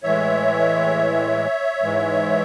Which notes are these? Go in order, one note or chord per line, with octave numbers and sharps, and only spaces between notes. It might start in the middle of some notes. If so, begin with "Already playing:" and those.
A2 E3 G#3 C#5 E5
G#2 E3 G#3